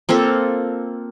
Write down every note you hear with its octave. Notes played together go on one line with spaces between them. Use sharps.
A#3 C4 F4 A4